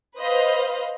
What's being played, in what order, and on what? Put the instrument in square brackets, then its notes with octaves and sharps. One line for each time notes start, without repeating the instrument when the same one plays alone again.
[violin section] B4 C5 D#5 F5